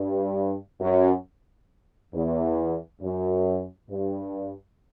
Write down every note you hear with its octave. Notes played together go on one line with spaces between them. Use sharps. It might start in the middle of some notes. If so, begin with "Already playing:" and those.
Already playing: G2
F#2
E2
F#2
G2